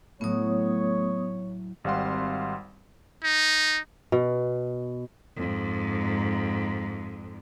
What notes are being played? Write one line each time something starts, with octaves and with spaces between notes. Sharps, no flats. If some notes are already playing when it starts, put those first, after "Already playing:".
A2 F#3 A3 B3 C#5 D#6
G#1 G3 C4 F5 F#5 C6
D#4
B2
F2 G#2